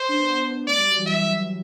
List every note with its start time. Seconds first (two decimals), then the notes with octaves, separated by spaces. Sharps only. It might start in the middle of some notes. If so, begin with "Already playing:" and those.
Already playing: C5
0.09 D4
0.17 B3
0.67 A3 D5
0.76 G3
0.86 F#3
0.97 E3
1.06 E5